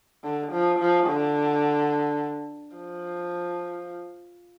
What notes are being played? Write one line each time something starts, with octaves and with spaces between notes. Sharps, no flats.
D3
F3
F3
D3
F3